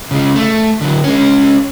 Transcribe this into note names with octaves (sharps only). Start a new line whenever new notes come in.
C#3 G#3
A3
D3 F#3
G#3 C#4